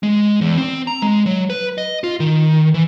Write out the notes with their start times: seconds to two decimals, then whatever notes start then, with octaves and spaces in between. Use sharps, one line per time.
0.03 G#3
0.41 E2
0.58 C4
0.87 A#5
1.02 G#3
1.26 F#3
1.50 B4
1.78 D#5
2.04 F4
2.20 D#3
2.74 E3